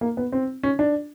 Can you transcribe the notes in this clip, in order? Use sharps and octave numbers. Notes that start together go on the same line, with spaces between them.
A#3
B3
C4
C#4
D4